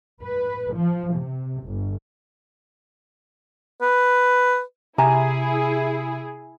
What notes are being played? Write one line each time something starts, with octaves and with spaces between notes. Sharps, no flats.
B4
F3
C3
G1
B4
C3 E4 G#4 G#5 A#5